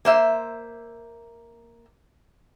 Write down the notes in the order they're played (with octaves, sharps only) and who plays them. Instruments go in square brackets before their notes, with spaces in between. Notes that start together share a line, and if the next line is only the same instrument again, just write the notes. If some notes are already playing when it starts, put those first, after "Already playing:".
[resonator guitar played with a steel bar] A#3 C5 E5